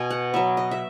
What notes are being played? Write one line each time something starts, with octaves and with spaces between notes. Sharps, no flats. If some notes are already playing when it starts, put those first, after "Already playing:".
Already playing: B2 G#5
F#5
F#3 B3 E5
D#5
E5